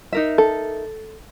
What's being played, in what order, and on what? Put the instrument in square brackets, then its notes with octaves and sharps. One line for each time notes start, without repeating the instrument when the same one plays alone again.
[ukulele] D#4 A#4 E5
[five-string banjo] A4